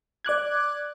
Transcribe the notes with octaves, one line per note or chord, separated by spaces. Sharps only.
D5 D6 F#6 G#6